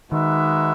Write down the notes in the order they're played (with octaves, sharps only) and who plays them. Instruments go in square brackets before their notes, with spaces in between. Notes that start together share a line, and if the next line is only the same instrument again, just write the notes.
[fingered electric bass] D#3 [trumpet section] G#3 D#4 F#4 B4 E5